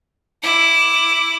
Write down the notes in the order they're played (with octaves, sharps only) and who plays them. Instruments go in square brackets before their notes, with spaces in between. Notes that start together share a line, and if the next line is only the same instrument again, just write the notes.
[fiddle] E4 D6